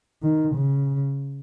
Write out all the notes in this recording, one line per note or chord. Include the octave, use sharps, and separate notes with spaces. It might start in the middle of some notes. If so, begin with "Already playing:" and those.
D#3
C#3